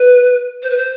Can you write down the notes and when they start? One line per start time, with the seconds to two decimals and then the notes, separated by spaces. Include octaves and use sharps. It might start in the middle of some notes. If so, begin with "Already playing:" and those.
Already playing: B4
0.63 C5
0.70 B4
0.77 C5